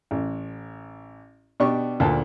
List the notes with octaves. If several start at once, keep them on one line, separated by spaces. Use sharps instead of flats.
A1
B2 D4 G4 C#6
D2 A#2 A#4 A5